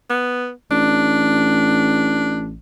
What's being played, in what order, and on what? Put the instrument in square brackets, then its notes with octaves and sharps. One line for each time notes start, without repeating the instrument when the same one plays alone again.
[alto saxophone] B3
[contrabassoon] A1 [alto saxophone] D4